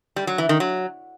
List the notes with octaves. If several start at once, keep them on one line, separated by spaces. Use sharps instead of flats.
G3
F#3
E3
D#3
F#3